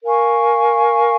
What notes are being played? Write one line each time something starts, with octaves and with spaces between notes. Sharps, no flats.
A#4 F5 G#5 C#6